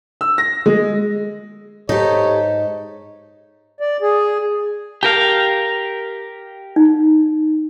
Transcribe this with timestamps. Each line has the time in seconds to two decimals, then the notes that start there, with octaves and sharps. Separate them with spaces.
0.21 E6
0.38 A#6
0.66 G#3
1.89 G#2 D#4 G4 A4 C#5
3.80 D5
4.02 G#4
5.03 G4 A#4 F5 A5
6.76 D#4